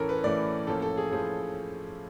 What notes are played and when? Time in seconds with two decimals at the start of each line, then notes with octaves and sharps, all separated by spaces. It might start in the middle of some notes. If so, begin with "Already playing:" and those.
Already playing: A2 E3 A3 C#4 A4 A#4
0.09 B4
0.24 A2 E3 A3 C#4 D5
0.67 A2 F3 A#3 C#4 A4
0.82 A4
0.97 G#4
1.12 A2 F3 G#4